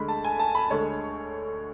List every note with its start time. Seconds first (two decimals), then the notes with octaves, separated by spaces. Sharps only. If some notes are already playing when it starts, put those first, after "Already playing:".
Already playing: D2 D3 G#3 B5
0.08 A5
0.24 G#5
0.39 A5
0.55 B5
0.70 D2 D3 G#3 C#5